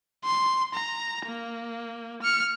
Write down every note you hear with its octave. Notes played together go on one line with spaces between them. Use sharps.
C6
A#5
A#3
F6 C#7